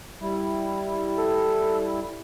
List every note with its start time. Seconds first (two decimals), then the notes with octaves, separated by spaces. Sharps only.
0.21 G3 E4
1.17 A4